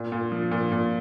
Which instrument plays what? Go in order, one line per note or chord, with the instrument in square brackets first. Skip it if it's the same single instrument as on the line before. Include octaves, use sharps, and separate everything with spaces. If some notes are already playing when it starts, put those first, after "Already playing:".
Already playing: [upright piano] A#2
A#2
F3
A#2
A#2